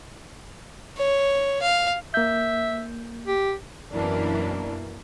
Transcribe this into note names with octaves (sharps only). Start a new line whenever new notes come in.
C#5
F5
A#3 E5 G6
G4
F#2 B2 E3 A#3 D4